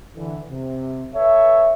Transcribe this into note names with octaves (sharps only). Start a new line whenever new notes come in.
D3 E3
C3
A4 B4 C#5 E5